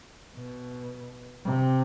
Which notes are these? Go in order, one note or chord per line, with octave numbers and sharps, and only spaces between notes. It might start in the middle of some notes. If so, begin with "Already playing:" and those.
B2
C3